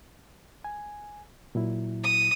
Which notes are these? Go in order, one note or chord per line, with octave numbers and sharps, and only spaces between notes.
G#5
A#2 F#3 E4
D#6